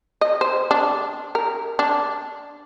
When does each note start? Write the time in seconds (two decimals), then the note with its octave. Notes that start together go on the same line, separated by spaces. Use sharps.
0.21 D#5
0.41 C5
0.71 D4
1.35 A#4
1.79 D4